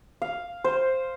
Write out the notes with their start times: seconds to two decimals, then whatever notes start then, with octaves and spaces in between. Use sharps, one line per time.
0.22 F5
0.64 C5